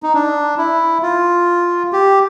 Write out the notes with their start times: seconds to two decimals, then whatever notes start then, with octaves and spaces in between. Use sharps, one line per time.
0.03 D#4
0.14 D4
0.58 E4
1.03 F4
1.93 G4